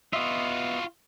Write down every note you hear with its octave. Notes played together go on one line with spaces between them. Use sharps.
B3 F4 F#4 D#5 E5